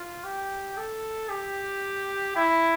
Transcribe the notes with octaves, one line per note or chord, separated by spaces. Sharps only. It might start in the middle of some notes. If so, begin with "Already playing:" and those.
Already playing: F4
G4
A4
G4
E4